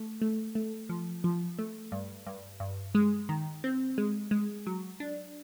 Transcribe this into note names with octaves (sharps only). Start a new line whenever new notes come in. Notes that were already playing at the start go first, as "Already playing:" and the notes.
Already playing: A3
A3
A3
F3
F3
A3
G2
G2
G2
G#3
D#3
C4
G#3
G#3
F#3
D4